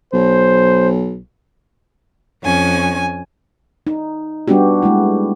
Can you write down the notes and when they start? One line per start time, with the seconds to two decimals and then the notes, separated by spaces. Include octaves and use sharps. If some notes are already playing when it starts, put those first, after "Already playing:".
0.13 B1 C5
2.43 F2 C#4 G#5
3.87 D#4
4.48 G3 B3 D4 F#4 G4
4.82 G#3 A3 E4